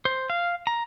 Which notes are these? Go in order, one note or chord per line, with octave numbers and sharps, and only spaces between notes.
C5
F5
A#5